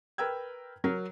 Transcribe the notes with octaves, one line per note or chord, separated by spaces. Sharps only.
A#4 B4 G5 E6 G#6
F#3 A#4